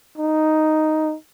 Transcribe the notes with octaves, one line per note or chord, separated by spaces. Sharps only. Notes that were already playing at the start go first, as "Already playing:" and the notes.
D#4